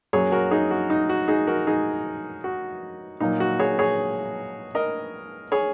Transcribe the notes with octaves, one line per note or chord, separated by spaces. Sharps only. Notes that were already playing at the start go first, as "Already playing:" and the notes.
F#2 F#3 A#3 G#4 C#5
F#4 A#4
D#4 G#4
F#4
D#4
F#4
D#4 G#4
F#4 A#4
D#4 G#4
F#4
A#2 F#3 A#3 D#4
F#4
G#4 C#5
G#4 C#5
A#4 D#5
G#4 C#5